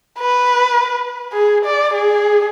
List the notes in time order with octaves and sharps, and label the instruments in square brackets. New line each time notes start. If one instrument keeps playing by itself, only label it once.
[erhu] B4
G#4
D5
G#4